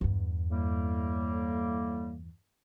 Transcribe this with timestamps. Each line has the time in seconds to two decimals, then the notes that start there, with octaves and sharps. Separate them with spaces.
0.01 E2 G2
0.51 A2 G3 A#3